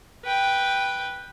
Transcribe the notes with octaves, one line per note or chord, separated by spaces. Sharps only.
B4 G5